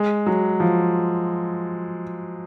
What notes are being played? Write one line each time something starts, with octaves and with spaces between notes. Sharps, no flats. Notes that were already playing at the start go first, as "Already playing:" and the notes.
Already playing: G#3
F#3
F3